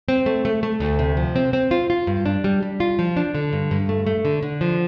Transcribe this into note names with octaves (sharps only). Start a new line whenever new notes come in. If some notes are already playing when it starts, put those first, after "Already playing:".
C4
A3
A3
A3
D2
C3
F3
C4
C4
F4
F4
G2
D4
G3
G3
F4
F3
D4
D3
G2
G2
A3
A3
D3
D3
F3